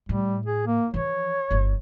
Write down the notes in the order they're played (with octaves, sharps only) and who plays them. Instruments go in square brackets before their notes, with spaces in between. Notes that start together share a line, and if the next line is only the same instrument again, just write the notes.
[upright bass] A2 [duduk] G3
[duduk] G#4
A#3
[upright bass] E3 F3 [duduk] C#5
[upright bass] G1 D#3